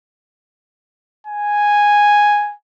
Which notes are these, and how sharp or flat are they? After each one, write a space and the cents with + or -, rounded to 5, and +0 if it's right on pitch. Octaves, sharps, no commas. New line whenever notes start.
G#5 -5